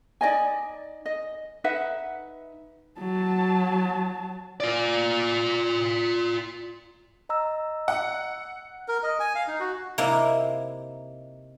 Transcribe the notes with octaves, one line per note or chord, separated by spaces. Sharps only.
D#4 D5 D#5 G#5
D#5
D#4 B4 E5 F#5
F#3 A5
F4 D5
D#5 A#5 E6
F#5
A#4
D#5
G#5
F5
D#4
F#4
C3 A#3 D#4 E4